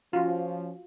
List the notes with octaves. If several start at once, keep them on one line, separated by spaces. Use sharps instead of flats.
F3 C#4 F4 F#4